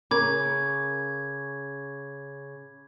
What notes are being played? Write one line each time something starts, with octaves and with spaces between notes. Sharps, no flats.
C#3 A#4 B5 D6 G#6